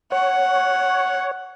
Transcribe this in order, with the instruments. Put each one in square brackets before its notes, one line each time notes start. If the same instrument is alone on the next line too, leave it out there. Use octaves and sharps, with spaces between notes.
[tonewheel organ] C#5 [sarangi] F#5